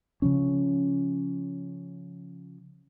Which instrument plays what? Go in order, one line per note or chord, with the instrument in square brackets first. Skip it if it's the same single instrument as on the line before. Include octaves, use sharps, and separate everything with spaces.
[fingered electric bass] C#3 F3 C#4